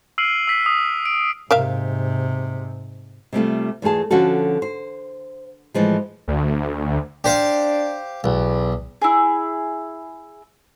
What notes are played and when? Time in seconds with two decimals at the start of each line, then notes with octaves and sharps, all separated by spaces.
0.18 E6 F6 C7 D7 D#7 F#7
0.47 E6 B6
0.66 D#6
1.06 D7
1.51 G#2 C3 A#4 E5 F5
3.33 C3 G3 A3 F4
3.82 E2 A3 F4 G#4 A5
4.11 D3 F3 C#4 F#4 A4
4.62 C5
5.74 A2 E3 F3 G#3
6.28 D2
7.24 D4 G4 C5 F5
8.24 B1 E2
9.02 E4 G#4